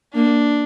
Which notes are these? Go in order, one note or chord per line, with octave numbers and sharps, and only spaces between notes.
A#3 D4